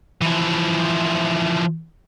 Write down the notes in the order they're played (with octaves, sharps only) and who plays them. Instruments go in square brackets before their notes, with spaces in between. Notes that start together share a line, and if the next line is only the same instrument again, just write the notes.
[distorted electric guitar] E3 F3